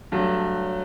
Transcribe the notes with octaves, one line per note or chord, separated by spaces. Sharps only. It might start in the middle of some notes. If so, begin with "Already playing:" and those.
G2 F#3 A3